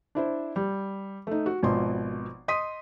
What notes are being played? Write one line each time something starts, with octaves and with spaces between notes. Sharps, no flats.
D4 E4 C5
G3
A3 D#4
F#4
G#1 B2 F3 C6
D#5 C6 D#6 B6 D#7